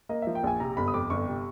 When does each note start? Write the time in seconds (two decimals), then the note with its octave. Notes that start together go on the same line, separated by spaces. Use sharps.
0.09 A#3 D#5
0.22 F3 E5
0.35 G5
0.44 A#1 G#5
0.60 C3 A#5
0.77 G1 B5
0.88 D#6
0.94 F2 D6
1.10 G1 C#6
1.28 C3